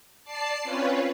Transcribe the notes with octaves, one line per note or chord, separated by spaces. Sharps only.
D5 A5 C7
C4 C#4 F4 B4 C#5